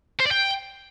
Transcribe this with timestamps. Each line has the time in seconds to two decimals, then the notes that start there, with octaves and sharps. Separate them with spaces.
0.20 C5
0.26 D5
0.31 G5